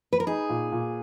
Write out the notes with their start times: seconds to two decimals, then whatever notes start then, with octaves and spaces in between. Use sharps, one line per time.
0.13 B4
0.20 A#4
0.27 D#4 G#4
0.50 A#2
0.72 A#2